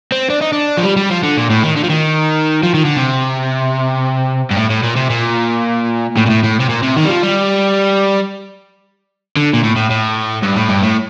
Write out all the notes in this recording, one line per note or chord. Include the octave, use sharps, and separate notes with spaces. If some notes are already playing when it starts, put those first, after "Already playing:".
C4
D4
D#4
D4
F3
G3
G3
F3
D3
A#2
A2
D#3
D3
F3
D#3
F3
D#3
D3
C3
G2
A2
A2
A#2
C3
A#2
A2
A#2
A2
A2
C3
A#2
C3
D#3
G3
F3
G3
D3
A#2
A2
A2
A2
G2
A2
G2
A2